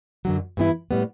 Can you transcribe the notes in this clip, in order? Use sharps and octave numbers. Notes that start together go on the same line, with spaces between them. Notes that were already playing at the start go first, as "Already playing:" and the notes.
F#2 D3 F#3
G2 E3 B3 E4
A2 G3 B3